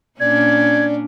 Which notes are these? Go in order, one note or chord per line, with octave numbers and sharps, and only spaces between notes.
A#2 C#4 D4 D5 G#6